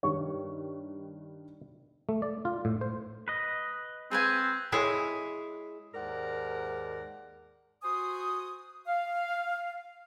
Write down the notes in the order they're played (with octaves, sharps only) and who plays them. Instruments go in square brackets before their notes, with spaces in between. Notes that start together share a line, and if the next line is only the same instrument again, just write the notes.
[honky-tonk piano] G2 D#3 G3 [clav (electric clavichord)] C#5
[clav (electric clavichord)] A3
D5
F4
A2
C5
[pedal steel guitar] B4 D#5
[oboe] C4 [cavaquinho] G#4 B4 G#5
[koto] G#3 E4 G#4 C#5
[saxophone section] D#2 G#2 A#4 D5 F#5
[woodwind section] F#4 C5 G#5 C6 D#6
F5